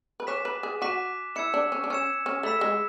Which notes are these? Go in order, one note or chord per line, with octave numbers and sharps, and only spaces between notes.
B4
C#5 G#5 D6 F#6 B6 E7
B4
G#4
F#4 G#5 D6 F#6 B6 E7
E4 E6 G#6 C#7 E7
D4
C#4
D4
C#4 E6 G#6 C#7 E7
C#4
A3 B5 E6 B6 E7
G#3